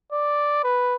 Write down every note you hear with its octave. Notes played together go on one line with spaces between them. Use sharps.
D5
B4